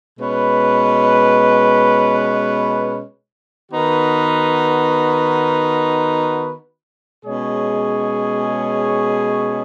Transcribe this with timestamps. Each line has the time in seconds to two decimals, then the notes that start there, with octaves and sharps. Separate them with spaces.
0.18 B2 G#3 C#4 B4
3.71 D#3 B3 D#4 F#4 B4
7.24 B2 G#3 C#4 G#4 C#5